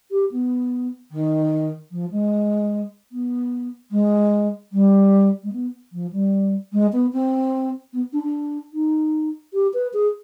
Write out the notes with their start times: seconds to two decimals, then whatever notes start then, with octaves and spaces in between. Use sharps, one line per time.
0.11 G4
0.32 B3
1.12 D#3
1.91 F3
2.11 G#3
3.12 B3
3.92 G#3
4.72 G3
5.43 G#3
5.53 B3
5.92 F3
6.13 G3
6.73 G#3
6.93 B3
7.13 C4
7.93 B3
8.13 D4
8.23 D4
8.73 D#4
9.53 G4
9.74 B4
9.94 G#4